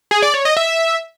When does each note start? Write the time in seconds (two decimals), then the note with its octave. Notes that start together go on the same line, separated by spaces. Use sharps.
0.11 G#4
0.22 D5
0.34 C#5
0.45 D#5
0.57 E5